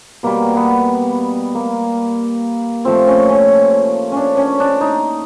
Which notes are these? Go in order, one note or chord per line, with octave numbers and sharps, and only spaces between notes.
B2 G3 A#3
B3
A#3
A#2 F3 A3 C4
C#4
C#4
C#4 D4
C#4
D4
D#4